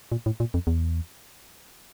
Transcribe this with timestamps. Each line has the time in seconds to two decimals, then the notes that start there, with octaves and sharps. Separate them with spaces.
0.12 A#2
0.26 A2
0.40 A#2
0.54 F2
0.67 E2